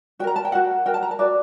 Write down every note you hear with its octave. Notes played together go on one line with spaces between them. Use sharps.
F#4 A#4 G5 A#5
A5
G5
F#4 A#4 F#5
F#4 A#4 G5
A5
A#5
A5
F#4 A#4 D5